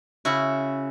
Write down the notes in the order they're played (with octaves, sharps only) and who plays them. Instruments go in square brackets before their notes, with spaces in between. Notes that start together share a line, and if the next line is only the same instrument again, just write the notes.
[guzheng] C#3 E4 F#4